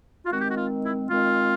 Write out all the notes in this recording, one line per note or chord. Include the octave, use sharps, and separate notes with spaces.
F4
D#3 G#3 C4 F#4
G4
F#4
F4
E4
D#3 G#3 C4 F4